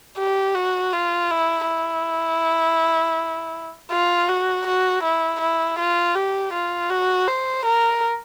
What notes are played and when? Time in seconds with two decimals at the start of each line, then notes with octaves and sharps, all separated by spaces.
0.18 G4
0.55 F#4
0.93 F4
1.31 E4
1.67 E4
3.91 F4
4.28 F#4
4.67 F#4
5.03 E4
5.41 E4
5.79 F4
6.15 G4
6.53 F4
6.90 F#4
7.27 C5
7.65 A#4